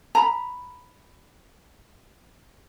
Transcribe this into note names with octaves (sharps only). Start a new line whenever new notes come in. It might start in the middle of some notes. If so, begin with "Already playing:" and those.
A#5 B5